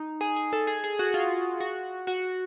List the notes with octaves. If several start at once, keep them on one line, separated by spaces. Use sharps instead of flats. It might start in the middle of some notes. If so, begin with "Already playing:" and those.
Already playing: D#4
G#4
G#4
A4
G#4
G#4
F#4
F4
F#4
F#4